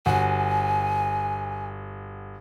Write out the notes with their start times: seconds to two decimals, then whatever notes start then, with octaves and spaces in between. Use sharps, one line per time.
0.06 G1 F#4 G#5